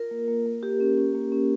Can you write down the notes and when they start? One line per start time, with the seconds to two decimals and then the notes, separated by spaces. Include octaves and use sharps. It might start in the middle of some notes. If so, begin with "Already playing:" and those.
Already playing: F4 A#4
0.11 A#3
0.28 A#3
0.46 A#3
0.63 A#3 G4
0.80 C#4
0.98 C#4
1.15 A#3
1.32 C#4